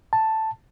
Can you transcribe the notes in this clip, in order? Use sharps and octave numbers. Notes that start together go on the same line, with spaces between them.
A5